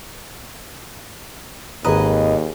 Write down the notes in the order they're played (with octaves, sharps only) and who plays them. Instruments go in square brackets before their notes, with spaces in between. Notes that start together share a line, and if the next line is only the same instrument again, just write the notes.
[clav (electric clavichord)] G#1 B4 [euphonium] D#2 [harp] G#4 A#5 [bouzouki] D#5